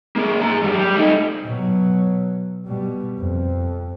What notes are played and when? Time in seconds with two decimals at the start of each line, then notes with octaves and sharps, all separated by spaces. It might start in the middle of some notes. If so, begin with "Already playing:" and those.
0.16 A#3 G#4
0.42 G#4 A#5
0.62 F#2 G3
0.79 G3
0.96 A3 D#4
1.44 B2 F#3
2.66 B2 G3
3.19 F2